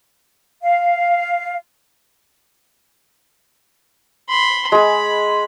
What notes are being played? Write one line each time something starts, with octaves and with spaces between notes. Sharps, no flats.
F5
B5 C6
G#3 G#4 B5